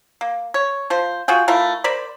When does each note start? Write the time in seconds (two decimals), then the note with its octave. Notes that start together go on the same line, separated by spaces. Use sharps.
0.21 A#3
0.54 C#5
0.90 F3 C5
1.28 F4 F#4 G#4 G5
1.48 A3 E4 F4 A#4
1.84 A#4 C5 D5 B5